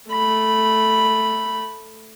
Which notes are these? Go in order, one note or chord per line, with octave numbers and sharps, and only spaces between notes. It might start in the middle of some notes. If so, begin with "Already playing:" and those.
A3 B5